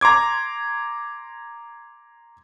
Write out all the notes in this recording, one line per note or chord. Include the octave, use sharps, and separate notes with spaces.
A#5 C6 D6 G#6